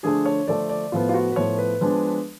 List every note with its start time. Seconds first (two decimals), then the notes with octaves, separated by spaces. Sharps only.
0.03 D3 F3 A3 D4 G#4
0.26 C#5
0.48 D3 F3 A3 D4 D5
0.69 D5
0.92 A2 F3 B3 F4
1.09 F4
1.14 F#4
1.32 B4
1.36 A2 F3 B3 C#5
1.59 B4
1.81 F3 G#3 B3 D4